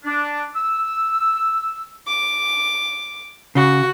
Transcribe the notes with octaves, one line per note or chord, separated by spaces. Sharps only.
D4
E6
D6
C#3 F#4